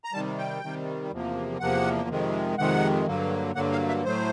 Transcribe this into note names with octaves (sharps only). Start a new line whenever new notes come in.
A#5
C3 D#3 G3 A5
G5
C3 D#3 G3
E2 C3 F3 A#3
E2 C3 F3 A#3 F#5
F2 C3 D#3 G#3
F2 C3 D#3 G#3 F#5
G2 D3 F#3 A#3
G2 D3 F#3 A#3 F#5
F5
E5
A2 F#3 A3 C5